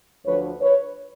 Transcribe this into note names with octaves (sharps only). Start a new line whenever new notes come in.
D2 D3 F3 B4 C#5
B4 C#5